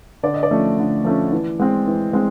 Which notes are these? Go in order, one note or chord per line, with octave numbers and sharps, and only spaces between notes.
D3 D5
D#5
D5
F3 A3 C#4
D3
F3 A3 C#4
E3
G#3 C4
E3
G#3 C4